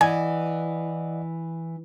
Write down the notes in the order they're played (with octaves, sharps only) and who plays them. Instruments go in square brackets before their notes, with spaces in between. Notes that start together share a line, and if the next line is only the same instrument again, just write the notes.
[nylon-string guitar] E3 [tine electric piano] D5 D#5 F#5 [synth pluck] G#5